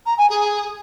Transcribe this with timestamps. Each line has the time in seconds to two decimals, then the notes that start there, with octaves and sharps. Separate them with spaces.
0.06 A#5
0.18 G#5
0.29 G#4